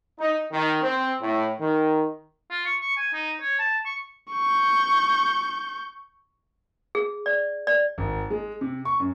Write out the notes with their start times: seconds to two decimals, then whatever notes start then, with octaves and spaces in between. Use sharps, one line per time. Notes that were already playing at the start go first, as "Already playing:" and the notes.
0.20 D#4
0.52 D#3
0.82 C4
1.21 A2
1.60 D#3
2.50 F4
2.65 C#6
2.81 C#6
2.97 G#5
3.13 D#4
3.41 C#5
3.59 A5
3.86 C#6
4.33 C#6 G6
6.95 G#4
7.26 D5
7.67 D5
7.98 G#1
8.30 G#3
8.61 C3
8.85 C#6
9.00 F#2